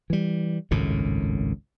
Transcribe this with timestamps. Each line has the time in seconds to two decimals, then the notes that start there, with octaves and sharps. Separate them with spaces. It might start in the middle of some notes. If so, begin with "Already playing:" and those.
0.10 E3 G3
0.71 G#1 C#2 F#2 A2